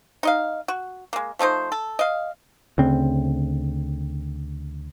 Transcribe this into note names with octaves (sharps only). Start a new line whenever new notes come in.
D#4 D#5 F5
F#4
G#3 A#3
F3 A3 D#4 C5
A4
D#5 F5
D2 C#3 C4